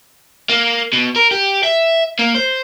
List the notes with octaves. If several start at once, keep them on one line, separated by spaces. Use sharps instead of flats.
A#3
B2
A#4
G4
E5
A#3
C5